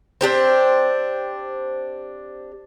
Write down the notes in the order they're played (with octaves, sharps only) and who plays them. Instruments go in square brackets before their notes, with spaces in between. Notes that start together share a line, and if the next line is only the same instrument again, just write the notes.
[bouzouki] C4 D4 G4 C5